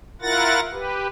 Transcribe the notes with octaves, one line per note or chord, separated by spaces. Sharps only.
E4 F4 A#4 F#5 A6 A#6
G4 B4